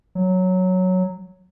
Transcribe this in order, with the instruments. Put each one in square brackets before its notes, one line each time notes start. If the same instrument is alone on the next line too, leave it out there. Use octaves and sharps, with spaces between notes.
[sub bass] F#3